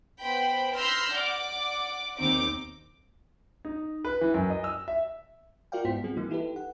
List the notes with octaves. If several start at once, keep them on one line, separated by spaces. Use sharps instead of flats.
B3 C5 G5 B5
B5 C6 E6 F6 G6 A#6
D5 F#5 D6
D#2 C4 D#4 D6
D#4
B4
E3
F#2
D#5
E6
E5
F4 F#4 A#4 D5 F5 G5
G#2 B3 E4 C5 B6
G3 C4 F4 F#4 G#4
E3 A#3 D#4
D#4 E4 G4 A4 B4
F#5